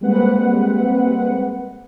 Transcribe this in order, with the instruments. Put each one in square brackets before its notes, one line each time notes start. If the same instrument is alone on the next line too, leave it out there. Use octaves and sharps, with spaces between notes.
[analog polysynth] G3 G#3 A#3 C4 B4 F#5